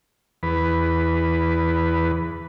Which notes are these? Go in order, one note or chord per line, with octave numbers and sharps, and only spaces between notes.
E2 B4